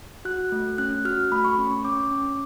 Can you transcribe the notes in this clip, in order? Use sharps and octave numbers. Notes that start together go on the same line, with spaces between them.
F#4 F#6
A3
C#4 F#6
F#4 F6
A3 B5
C#6
C#4
C#6
C#4 D6
C#4